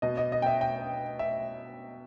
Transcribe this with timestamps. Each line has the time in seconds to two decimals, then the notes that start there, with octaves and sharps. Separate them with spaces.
0.02 B2 D#5
0.17 D#5
0.32 D#5
0.42 G5
0.46 E5
0.61 G5
1.19 E5